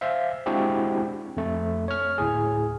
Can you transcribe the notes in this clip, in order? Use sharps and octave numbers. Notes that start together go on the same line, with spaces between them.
C5 E5 F5
G#3 C4 D4 E4 F#4 G4
F2 A3
C#5 F6
D2 A2 G#4